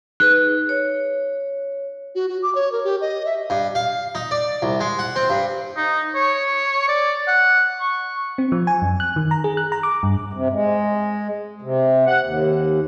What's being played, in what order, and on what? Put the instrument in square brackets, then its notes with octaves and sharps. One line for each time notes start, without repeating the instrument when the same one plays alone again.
[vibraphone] D#4 G#4 B4 [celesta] F#6
[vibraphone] C#5
[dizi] F#4
F#4
D6
C#5
A#4
G4
D#5
E5
[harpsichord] G2
F5
D#4
D5
C2
G#3
F#5
C4
G2
[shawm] D#4
C#5
D5
F#5
C#6
[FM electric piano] C4
F3
G#5
F#2
F#6
D#3
A#5
G#4
F#6
A#5
D6
G2
[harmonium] C3
G#3
C3
F#5
D#2